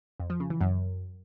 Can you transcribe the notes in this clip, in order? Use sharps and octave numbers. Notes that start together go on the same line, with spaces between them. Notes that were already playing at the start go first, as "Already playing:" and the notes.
F2
F3
C#3
E3
F#2